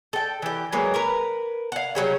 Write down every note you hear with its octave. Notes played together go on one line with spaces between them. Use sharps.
A4 G5
E3 G4
F#3 G#3 A#3 B4
A#4 B4 A#5
F5 F#5
C#3 F#3 G3 C#4